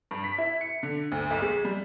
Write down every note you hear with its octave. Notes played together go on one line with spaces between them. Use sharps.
G2
B6
E4
C#7
D3
D2
B1
G#3
G3